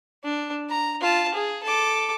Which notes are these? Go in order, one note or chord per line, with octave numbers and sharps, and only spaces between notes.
D4
A#5
F4 A5
G#4
A4 D6